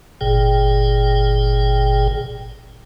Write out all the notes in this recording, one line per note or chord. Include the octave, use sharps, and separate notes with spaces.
G1 A#2 G#4 G5